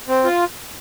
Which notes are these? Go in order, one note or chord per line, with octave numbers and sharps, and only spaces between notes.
C4
F4